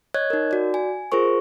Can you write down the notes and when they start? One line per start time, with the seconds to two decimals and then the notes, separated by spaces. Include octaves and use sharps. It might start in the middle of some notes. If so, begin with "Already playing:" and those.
0.14 C#5 D#5 F#6 G#6
0.30 D#4 A#4
0.51 F#4 D5
0.74 G#5
1.12 F4 G#4 A#4 C5 C#6